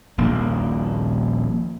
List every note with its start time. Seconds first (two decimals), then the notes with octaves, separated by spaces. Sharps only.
0.18 D#1 A#1 A#3